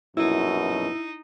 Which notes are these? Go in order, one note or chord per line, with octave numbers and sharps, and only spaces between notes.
A#1 F#2 B2 D#4 E4